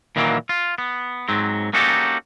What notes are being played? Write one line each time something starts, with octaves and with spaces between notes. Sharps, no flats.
A#2 D#3 E3 F#3 A#3
F4
B3
G#2 F#3 C4
A#3 C#4 D#4 F#4 G4 A4